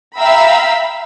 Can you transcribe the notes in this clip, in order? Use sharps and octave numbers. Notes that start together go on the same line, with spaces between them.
E5 F5 G5 A#5 B5 E6